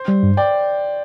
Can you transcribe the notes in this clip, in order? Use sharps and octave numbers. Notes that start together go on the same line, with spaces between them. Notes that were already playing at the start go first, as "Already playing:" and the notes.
Already playing: C5
G3
G2
D5 G5